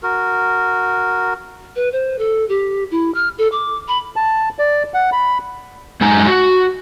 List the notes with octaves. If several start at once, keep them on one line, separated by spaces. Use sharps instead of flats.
F#4 A#4
B4
C5
A4
G4
E4
F6
A4
D6
B5
A5
D5
F#5
B5
F#2 G#3 D#4 G#5 A#5
F#4